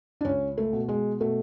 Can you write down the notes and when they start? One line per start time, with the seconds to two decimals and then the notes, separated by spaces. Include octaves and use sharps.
0.21 D4
0.25 C#2 C#4
0.58 A3
0.73 B2
0.88 G#3
1.21 B2 A3